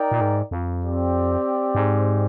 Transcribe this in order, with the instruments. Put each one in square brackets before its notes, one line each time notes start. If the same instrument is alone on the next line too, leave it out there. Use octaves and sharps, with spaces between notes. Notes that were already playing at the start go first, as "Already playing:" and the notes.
Already playing: [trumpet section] D#4 A#4 D5 G5
[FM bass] A#2
G#2
F2
[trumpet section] C4 G4 D5
[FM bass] G#2